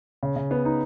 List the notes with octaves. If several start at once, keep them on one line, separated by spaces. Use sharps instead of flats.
C#3
C#3
B3
D#4